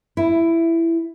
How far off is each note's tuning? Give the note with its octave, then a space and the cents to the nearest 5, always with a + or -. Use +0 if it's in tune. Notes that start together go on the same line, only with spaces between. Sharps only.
E4 +10